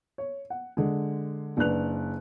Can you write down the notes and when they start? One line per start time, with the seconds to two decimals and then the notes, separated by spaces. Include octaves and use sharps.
0.18 C#5
0.50 F#5
0.77 D3 G#3
1.57 F#1 D4 B4 F#6 F7